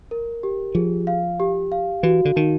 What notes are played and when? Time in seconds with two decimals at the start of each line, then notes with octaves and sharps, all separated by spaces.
0.11 A#4
0.43 G4
0.75 F3 G#4
1.07 F5
1.40 G4
1.72 F5
2.03 E3 F#4
2.25 D3
2.36 D#3 D#4